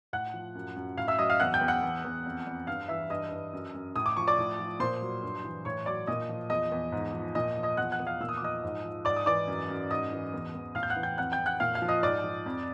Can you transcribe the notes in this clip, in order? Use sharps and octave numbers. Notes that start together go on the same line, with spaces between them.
A2 F#5 F#6
F3
F#2
F#2
A2 F5 F6
E5 E6
F#3 D#5 D#6
F5 F6
E2 F#5 F#6
G5 G6
E2
F#5 F#6
E2
E2
F2
F2
G2 F5 F6
E3 E5 E6
G2 D#5 D#6
G2
F#2
F#2
A2 D#6
D6
F3 C#6
D5 D6
A2
F3
A#2 C5 C6
F#3
G2
E3
A2 C#5 C#6
F#3 D5 D6
A#2 D#5 D#6
F3
E2 D#5 D#6
E2
G#2
F3
A#2 D#5 D#6
F3
D#5 D#6
E2 F#5 F#6
F#5 F#6
E2
F5 F6
A#2 E6
D#6
D6
F3 D#5 D#6
G#2
F3
G#2 D5 D6
D#6
E3 D5 D6
F#2
F#2
G#2 D#5 D#6
E3
E2
E2
A2 F5 F6
G6
F#5 F#6
E3
G5 G6
F2 F#5 F#6
G5 G6
F2
F#5 F#6
A#2 F5 F6
F5 F6
F3
D#5 D#6
G#2 D5 D6
F3
F2